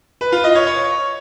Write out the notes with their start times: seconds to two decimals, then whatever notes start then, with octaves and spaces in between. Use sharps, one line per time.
0.21 B4
0.32 F4
0.44 D#5
0.55 C#5
0.67 C#5